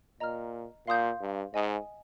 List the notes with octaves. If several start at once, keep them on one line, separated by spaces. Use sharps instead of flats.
A#2 D#5 A#5 F6
A#2 F5 C6 D#6 G6
G2
G#2 D#5 G#5 D#6